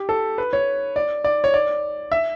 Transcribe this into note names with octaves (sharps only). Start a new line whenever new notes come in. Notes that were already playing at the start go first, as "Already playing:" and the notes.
Already playing: G4
A4
B4
C#5
D5
D5
C#5
D5
E5